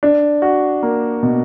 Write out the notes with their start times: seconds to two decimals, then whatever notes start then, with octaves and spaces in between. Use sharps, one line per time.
0.03 D4
0.42 F#4
0.83 A#3
1.23 B2